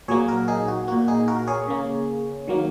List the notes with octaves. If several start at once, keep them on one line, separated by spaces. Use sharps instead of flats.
A#2 F#3 A#3 G#4 C#5
F#4 A#4
D#4 G#4
F#4
A#2 A#3 F#4
D#4 G#4
F#4 A#4
G#4 C#5
C#3 A#3
D#3 F#3 A#3